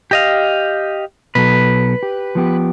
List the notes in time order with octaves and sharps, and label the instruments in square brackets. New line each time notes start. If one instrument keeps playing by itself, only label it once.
[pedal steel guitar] G4 D#5 F5
[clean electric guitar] B2 F#3 A4 [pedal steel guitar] B4
[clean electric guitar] G4
F3 B3 G4